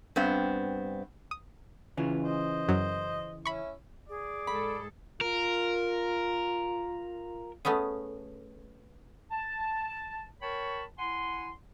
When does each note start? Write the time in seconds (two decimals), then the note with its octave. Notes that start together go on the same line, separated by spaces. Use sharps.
0.16 G2 B3 C4
1.31 D#6
1.97 C#3 E3 F4
2.23 C5 D#5
2.69 F#2 F#3
3.45 C#4 E4 B5 C#6
4.09 G#4 D5
4.47 G#2 A4 B5
5.21 F4 A#4
7.65 A3 B3 C#4 G#4
9.31 A5
10.42 A#4 C#5 G5 A5 B5 C#6
10.99 E4 F#5 G#5 C6